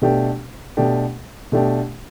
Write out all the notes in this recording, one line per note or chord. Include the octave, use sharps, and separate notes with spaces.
B2 A3 D4 G4
B2 A3 D4 G4
B2 A3 D4 G4